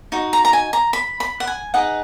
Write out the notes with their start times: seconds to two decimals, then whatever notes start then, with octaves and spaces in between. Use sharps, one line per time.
0.12 D#4 F#4
0.33 A#5
0.45 A#5
0.53 G#5
0.73 A#5
0.93 B5
1.20 B5
1.40 F#5
1.47 G#5
1.74 D#4 G#4 B4 D#5 F#5